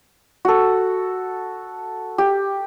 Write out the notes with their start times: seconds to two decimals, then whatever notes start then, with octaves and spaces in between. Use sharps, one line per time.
0.45 F#4 A4
2.18 G4